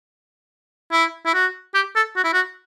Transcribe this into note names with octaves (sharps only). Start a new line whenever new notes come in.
E4
E4
F#4
G4
A4
F#4
E4
F#4